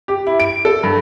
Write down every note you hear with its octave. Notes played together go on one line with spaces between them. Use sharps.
G4
E4
D7
A4
G2